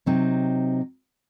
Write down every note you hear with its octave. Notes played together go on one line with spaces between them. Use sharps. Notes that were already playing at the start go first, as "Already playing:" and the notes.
C3 F#3 C4 D#4